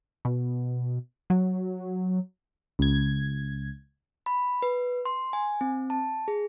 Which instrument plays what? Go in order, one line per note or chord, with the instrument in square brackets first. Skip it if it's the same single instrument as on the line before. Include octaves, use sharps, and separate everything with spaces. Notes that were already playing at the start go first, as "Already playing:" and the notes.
[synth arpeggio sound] B2
F#3
[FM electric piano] C#2 G#6
[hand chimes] B5
B4
C6
G#5
C4
A5
G#4